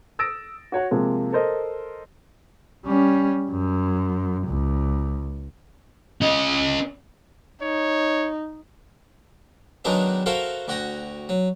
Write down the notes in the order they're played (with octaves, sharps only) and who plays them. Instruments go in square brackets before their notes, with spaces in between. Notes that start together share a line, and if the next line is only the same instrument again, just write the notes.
[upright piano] D#6 E6 A6 A#6 D7
F#4 C#5 F#5
C3 F3 G#3 A#3
A4 A#4 C5 D#5
[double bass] G3 C#4
F#2
C#2
[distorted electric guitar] C#4 D#5
[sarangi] D#4 [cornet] C#5
[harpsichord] D#3 F#3 G#3 B3 D4 D#4
F#4 A4 A#4 C5 E5 F5
D2 F#4 G5 A#5
F#3